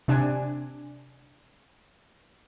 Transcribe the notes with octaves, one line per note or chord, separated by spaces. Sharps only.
C3 D4 G#5